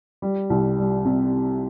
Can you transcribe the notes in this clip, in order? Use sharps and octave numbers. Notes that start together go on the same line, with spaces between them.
G3
C2
G3
C3